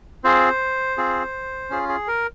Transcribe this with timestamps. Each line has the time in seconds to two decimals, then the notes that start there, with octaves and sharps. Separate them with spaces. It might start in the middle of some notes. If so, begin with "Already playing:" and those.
0.24 C4 F4 G#4 C5
0.97 C4 F4 G#4
1.70 C#4 F4 G#4
1.89 G#4
2.08 A#4